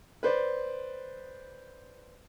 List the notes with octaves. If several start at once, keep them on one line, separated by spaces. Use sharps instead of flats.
B4 C5 D5